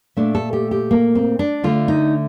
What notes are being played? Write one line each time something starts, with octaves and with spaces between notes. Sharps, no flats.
A#2 A3 D4
A4
G4
G4
A#3
C4
D4
D3 A3 F4
D#4